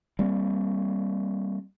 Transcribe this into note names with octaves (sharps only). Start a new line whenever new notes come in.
G3 A#3 C4